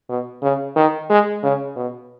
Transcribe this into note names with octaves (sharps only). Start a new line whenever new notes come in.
B2
C#3
D#3
G#3
C#3
B2